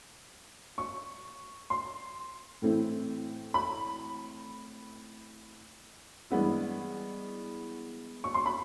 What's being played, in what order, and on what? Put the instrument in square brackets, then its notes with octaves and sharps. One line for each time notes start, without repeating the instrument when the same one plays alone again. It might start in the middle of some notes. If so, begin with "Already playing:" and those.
[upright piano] C#6
C6
A2 E3 A3 C4 E4
B5
G2 E3 G#3 B3 E4
C#6
C6
B5